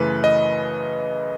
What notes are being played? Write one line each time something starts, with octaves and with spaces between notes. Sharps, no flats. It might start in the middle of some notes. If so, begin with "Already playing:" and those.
Already playing: F#2 C#3 E3 A3 B4
D#5